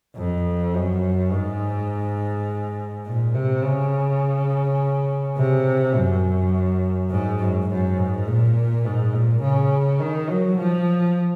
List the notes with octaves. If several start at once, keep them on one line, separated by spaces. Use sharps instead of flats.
F2
F#2
G#2
A#2
C3
C#3
C3
F#2
G#2
F#2
F#2
G#2
A#2
G#2
A#2
C#3
D#3
F#3
F3